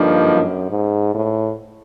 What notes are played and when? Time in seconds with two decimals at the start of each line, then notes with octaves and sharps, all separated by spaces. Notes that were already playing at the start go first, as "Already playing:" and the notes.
Already playing: G2 D3 F3 A#3 D#4
0.25 F#2
0.70 G#2
1.15 A2